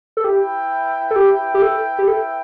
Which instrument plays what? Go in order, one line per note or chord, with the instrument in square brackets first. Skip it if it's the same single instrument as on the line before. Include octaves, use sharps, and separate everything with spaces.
[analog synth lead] A4
[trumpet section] E4 B4 E5 G5 [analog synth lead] G4
[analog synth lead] A4
G4
G4
A4
G4
A4